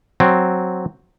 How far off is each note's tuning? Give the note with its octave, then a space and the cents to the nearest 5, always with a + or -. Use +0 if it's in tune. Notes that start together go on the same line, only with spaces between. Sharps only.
F#3 +0 C4 +0